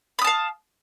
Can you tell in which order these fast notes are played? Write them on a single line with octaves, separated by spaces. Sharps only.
B5 D#6 A5 F5